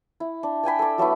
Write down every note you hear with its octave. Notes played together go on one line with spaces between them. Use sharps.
E4
D4
D5 G5 G#5 B5
A4 D5
F#3 A3 B3 E4